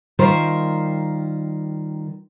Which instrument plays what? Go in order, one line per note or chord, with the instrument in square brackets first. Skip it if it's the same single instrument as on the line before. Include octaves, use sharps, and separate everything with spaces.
[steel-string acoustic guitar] D#3 G3 F4 A#4 C5